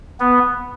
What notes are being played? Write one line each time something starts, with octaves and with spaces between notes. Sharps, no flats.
B3